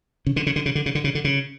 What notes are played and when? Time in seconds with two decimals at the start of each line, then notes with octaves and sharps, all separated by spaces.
0.26 C#3
0.36 D3
0.46 C#3
0.56 D3
0.66 C#3
0.75 D3
0.86 C#3
0.95 D3
1.04 C#3
1.15 D3
1.24 C#3